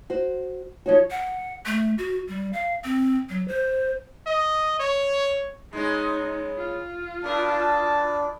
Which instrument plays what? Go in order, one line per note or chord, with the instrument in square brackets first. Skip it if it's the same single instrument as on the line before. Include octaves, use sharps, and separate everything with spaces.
[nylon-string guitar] F#4 C5
[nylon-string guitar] F3 D#4 F#4 [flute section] C#5
[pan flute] F#5
A3
F#4
G3
F5
C4
F#3
C5
[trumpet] D#5
C#5
[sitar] G#3 B3 C#4 [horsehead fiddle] D#4
[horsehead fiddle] F4
[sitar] B2 A#4 [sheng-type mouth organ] D4 [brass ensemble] A5